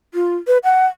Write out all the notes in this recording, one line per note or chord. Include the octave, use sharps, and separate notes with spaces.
F4
B4
F#5